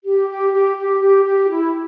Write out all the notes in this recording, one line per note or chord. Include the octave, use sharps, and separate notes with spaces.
G4
G4
G4
G4
G4
G4
E4